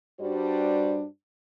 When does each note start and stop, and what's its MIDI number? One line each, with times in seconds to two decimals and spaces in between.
0.20 1.04 43
0.20 1.04 55
0.20 1.04 62
0.20 1.04 66
0.20 1.04 72
0.20 1.04 74